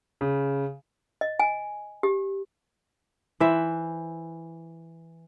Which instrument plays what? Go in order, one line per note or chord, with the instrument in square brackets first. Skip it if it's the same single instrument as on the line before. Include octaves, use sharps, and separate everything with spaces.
[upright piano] C#3
[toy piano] D#5
G#5
G4
[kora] E3 B4 C5 E5